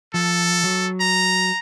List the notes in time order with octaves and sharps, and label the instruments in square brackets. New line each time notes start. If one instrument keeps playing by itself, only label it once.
[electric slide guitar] F3 [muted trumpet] A4
[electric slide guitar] F#3
[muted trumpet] A#5